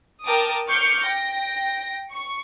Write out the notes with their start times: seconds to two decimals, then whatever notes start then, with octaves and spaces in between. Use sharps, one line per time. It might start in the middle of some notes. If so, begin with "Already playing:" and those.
0.24 A#4 G5 A5 D6 D#6
0.68 C#6 D6 F6 G6 C7 C#7
1.03 G5 A#6
2.12 C#6